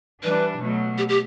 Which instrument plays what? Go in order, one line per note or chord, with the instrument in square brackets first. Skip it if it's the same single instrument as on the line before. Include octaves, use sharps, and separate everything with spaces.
[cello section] E3 G3 D4 [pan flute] B4
[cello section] B2 F#3 A3
[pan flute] G4
G4